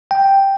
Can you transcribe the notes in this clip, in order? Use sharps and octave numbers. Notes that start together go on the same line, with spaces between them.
G5